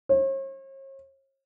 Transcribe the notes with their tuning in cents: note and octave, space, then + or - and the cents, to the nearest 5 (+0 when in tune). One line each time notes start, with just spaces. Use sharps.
C#5 -45